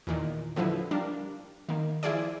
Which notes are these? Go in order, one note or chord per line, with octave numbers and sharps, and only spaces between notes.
E2 A#2 D#3
D3 F3 F#3 E4 B4
G3 D4 A#4 F5
D#3 A#3
F3 E4 F4 G#4 D5